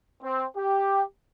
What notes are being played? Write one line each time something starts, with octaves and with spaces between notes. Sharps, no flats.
C4
G4